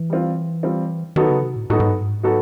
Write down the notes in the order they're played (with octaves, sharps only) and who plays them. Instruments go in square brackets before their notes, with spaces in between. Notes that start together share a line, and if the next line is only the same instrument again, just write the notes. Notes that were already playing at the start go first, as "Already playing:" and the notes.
Already playing: [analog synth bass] E3
[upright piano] G3 C4 F4
G3 C4 F4
[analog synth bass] D#3 [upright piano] F#3 B3 D#4 F#4 A4
[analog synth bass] C#3
C3
A2
[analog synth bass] A2 [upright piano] F#3 B3 D#4 F#4 A4
[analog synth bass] G#2
G2
G#2
[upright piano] F#3 B3 D#4 F#4 A4